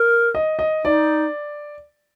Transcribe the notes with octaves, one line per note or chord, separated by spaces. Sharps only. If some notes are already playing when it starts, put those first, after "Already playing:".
Already playing: A#4
D#5
D#5
D#4 D5